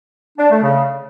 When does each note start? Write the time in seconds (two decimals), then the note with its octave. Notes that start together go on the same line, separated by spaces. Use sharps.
0.39 D4
0.51 A3
0.62 C#3